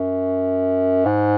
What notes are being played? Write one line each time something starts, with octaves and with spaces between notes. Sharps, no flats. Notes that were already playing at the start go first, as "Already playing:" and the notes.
Already playing: F#2
G#2